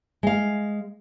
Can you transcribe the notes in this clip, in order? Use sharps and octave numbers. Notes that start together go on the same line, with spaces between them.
G#3 F5